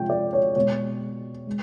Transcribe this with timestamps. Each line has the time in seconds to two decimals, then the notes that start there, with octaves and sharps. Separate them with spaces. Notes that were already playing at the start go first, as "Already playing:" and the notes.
Already playing: C3 F3 G#3 G5
0.10 D5
0.33 C#5
0.56 B2 G#3 C#5
1.46 G#3